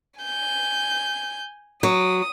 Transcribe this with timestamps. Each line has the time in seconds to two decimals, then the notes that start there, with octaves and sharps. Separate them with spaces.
0.20 G#5 G6
1.83 F#3 D#6